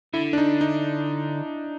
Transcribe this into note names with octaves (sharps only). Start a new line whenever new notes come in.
D3 E4
D4
D#4
D#4